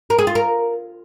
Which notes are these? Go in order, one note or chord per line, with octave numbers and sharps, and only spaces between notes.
A#4
G#4
F4
A#4